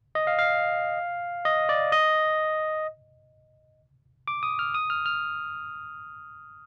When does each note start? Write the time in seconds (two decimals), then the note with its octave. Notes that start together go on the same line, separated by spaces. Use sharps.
0.15 D#5
0.27 F5
0.39 F5
1.45 D#5
1.69 D5
1.92 D#5
4.28 D6
4.43 D#6
4.59 F6
4.74 D#6
4.90 F6
5.06 F6